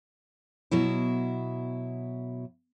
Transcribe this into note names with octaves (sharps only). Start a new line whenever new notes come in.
B2 F#3 E4